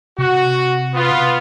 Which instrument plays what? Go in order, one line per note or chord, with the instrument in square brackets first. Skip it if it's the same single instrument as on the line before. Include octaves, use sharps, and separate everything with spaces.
[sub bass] C3 [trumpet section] F#4
[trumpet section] B3 F4